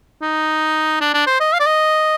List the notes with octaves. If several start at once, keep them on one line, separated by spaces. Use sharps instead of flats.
D#4
D4
D4
C5
D#5
F5
D5
D#5